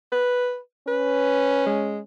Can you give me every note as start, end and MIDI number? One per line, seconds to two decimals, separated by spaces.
0.12 0.58 71
0.87 2.04 61
0.87 1.62 71
1.66 1.99 56